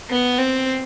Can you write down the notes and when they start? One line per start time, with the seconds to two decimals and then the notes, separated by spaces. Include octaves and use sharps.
0.10 B3
0.38 C4